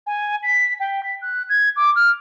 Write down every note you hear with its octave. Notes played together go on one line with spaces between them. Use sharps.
G#5
B6
G5
B6
F#6
G#6
D6
F6